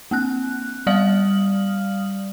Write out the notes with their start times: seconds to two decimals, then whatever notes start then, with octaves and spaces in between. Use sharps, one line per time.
0.11 A#3 C4 F#6
0.87 G3 D5 F5 D#6 F6 F#7